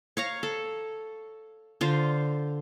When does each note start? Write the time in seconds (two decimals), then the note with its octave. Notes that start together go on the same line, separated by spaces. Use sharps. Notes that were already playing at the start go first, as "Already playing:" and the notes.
0.17 C#5 F5 A#5
0.43 A4
1.81 D3 F4 C5